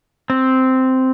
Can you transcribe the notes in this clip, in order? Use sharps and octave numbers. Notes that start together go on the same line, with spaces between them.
C4